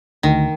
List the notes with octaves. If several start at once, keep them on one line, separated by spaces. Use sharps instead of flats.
D2 D#3